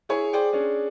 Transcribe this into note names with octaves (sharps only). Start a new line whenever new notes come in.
E4 G#4 C#5 G#5
G#4 C5 D5 G5
C#4 D4 G#4